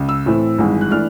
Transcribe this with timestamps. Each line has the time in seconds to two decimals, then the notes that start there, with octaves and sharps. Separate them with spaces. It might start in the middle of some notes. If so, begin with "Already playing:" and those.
Already playing: C#2
0.09 E6
0.26 A2 E3 A3 C4
0.58 G#1 G2 E3 G#3
0.81 F#6
0.91 E3 A3 D4 F6